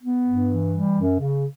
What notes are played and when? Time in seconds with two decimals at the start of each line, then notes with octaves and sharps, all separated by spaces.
0.03 B3
0.27 G2
0.50 E3
0.73 G3
0.96 F#2
1.19 C#3